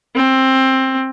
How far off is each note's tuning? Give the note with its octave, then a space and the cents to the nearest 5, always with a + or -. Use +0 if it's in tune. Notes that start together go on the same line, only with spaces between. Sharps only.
C4 +15